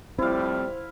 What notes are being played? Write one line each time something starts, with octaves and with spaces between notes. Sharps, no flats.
A2 F3 G3 C4 E4 C5 F5